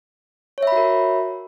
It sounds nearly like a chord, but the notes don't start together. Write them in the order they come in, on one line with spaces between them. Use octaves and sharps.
C#5 E5 B5 F#4 A#4